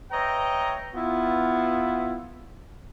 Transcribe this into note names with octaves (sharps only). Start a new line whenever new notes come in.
B4 C#5 D#5 E5 G5 A#5
B3 E4 F4